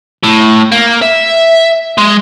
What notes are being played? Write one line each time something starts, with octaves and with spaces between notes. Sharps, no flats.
A2
A#3
E5
G#3